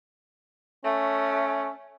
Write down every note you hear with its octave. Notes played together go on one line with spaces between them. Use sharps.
A3 C#4